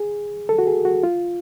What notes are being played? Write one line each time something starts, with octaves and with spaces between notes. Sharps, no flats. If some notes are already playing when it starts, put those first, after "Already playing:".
Already playing: G#4
A4
F#4
G#4
F#4
F4